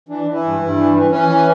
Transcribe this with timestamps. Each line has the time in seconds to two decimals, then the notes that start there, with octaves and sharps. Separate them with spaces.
0.09 E3 D4
0.26 E3
0.34 E4
0.44 G2
0.60 G2
0.77 E3
0.94 E3
1.11 E3 C#4
1.28 E3